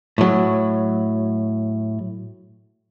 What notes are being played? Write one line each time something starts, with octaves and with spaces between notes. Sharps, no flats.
A2 F#3